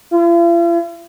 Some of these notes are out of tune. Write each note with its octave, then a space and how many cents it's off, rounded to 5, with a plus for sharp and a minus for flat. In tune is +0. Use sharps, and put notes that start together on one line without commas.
F4 -45